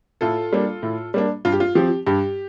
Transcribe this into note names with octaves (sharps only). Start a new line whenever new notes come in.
A2 F4 A4
G3 A#3 D4
A2
G3 A#3 D4
G2 F4
G4
F4
F3 C4 G4
G2 G4